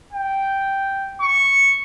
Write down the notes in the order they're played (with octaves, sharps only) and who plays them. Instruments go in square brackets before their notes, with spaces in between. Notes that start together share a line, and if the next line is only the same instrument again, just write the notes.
[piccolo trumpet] G5
C#6